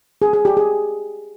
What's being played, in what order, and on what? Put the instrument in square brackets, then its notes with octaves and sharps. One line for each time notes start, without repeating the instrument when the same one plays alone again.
[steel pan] G#4
G#4
G4
G#4